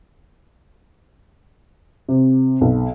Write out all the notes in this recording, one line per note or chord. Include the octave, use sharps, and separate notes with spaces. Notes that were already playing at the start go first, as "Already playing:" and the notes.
C3
B1